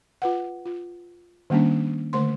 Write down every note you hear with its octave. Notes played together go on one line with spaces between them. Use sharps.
F4 B4 F#5
F4
D#3 G3 A#3 C#4 D4
D3 A3 C5 C6